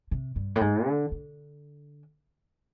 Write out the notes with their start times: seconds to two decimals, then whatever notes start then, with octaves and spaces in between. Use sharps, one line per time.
0.11 C3
0.36 G2
0.56 A2
0.61 G#2
0.87 D3
1.11 D3